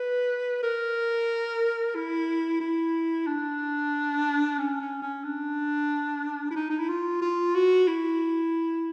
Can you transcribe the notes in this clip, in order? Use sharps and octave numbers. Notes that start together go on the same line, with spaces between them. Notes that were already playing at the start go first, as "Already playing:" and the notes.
Already playing: B4
A#4
E4
E4
D4
C#4
C#4
C#4
D4
E4
D#4
D#4
E4
F4
F4
F#4
E4